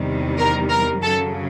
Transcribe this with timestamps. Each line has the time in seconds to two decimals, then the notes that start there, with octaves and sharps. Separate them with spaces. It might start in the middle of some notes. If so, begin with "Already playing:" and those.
Already playing: E2 C3 D#3 G3
0.38 A#4
0.70 A#4
1.02 F#2 C#3 F#3 A4